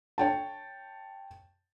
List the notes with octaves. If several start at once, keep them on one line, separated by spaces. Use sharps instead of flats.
C#5 G5 A5